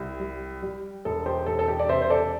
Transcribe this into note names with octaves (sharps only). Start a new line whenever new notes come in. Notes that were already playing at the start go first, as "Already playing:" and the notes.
Already playing: C2 G4
G3
G3
E1 A4
G4 C5
E1 A4
A4
G4
D5
C3 C5 E5
C5
A4 D5